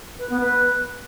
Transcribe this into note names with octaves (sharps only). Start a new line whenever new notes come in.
B4
B3
B4